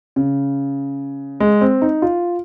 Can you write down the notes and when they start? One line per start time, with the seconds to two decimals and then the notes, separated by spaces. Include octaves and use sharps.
0.16 C#3
1.40 G#3
1.61 C4
1.82 D#4
2.02 F4